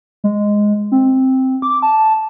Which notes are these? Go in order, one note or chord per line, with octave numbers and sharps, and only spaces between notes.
G#3
C4
D6
A5